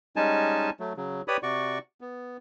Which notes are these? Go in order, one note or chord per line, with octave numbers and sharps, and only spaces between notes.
G3 G#3 C#4 D#4 G#5 A5
F#3 A3
C#3 F#3
G4 B4 C#5 D5 B5 D#6
C3 F#4 D5 C#6
B3